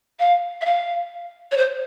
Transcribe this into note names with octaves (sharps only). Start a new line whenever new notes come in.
F5
E5
F5
C#5
C5